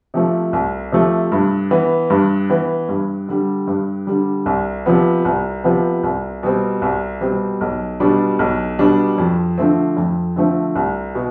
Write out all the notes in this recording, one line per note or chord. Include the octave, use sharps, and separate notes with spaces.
C3 F3 A3
C2
C3 F3 A3
G2
E3 B3
G2
E3 B3
G2
D3 G3
G2
D3 G3
C2
C3 F3 B3
C2
C3 F3 B3
C2
B2 G3 C4
C2
B2 G3 C4
B1
B2 G3 D4
B1
B2 G3 D4
F2
D3 F3 A3 C4
F2
D3 F3 A3 C4
C2
B2